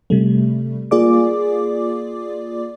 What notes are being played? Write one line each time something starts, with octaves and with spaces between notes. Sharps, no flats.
C3 G3 A3
A#3 F4 G#4 D5 D6